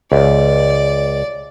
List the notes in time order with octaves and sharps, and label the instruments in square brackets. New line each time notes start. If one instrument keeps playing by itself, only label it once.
[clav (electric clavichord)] C#2 [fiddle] D5